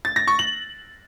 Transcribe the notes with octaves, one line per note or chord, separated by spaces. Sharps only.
A6
A#6
C#6
F#7